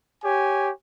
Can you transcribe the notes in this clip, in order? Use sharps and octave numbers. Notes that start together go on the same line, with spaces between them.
G4 C#5 G#5